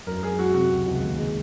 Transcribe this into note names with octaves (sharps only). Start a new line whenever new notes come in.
F#2 A#4
G#3 G#4
F#2 F#4
C3 F#4
C#2
C#2
D#2
G#3